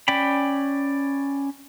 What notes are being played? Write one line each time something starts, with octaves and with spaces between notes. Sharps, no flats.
C#4 D5 G5 B5